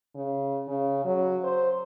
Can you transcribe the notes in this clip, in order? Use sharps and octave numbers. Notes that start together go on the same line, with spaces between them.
C#3
C#3
F#3
C5